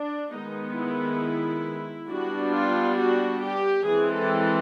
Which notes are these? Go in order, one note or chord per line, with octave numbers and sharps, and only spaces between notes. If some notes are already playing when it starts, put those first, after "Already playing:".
Already playing: D4
D#3 G#3 B3 D#4
E4
G3 B3 D4 F#4
F4
F#4
G4
E3 G#3 C4 G#4
A4